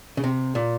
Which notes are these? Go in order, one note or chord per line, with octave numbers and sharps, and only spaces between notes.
C#3
C3
A#2